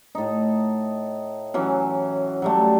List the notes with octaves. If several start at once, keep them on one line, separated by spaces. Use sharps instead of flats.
A2 D#4
E3 F#3 C#4
F#3 G3 A3